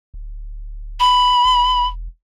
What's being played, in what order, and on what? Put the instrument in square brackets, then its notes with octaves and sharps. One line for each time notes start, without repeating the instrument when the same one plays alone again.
[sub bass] D1
[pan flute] B5
[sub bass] E1